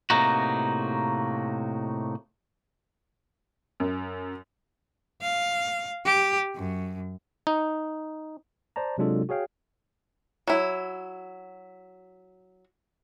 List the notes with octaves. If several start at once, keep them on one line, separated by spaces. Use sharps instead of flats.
A2 C3 A#3 D#4 F#4
F#2
F5
G4
F#2
D#4
C5 D5 A5 A#5
C3 F#3 G#3 D4 F4 A4
F#4 G#4 C#5 F5 G5
F#3 E4